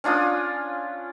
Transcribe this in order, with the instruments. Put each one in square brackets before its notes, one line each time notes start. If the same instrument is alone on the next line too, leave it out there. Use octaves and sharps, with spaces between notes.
[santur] C#4 D4 F4 D#6